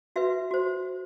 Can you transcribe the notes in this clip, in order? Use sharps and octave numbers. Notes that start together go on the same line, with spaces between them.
F#4 B4 E5
F#4 C5